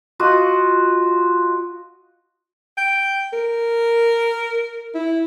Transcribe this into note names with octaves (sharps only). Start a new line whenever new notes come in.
F4 F#4 D#5
G5
A#4
E4